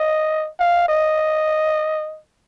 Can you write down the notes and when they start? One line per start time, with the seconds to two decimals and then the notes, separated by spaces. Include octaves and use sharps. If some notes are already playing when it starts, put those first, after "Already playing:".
Already playing: D#5
0.59 F5
0.88 D#5